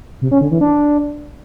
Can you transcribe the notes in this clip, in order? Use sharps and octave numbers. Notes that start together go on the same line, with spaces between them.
C3
C#4
D3
E3
D4